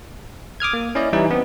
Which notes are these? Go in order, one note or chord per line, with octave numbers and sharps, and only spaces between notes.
D6 D#6 F6 G#6
A#3
C#4 E4 D5 D#5
E3 G3 C#4 D#4 E4
B3 C4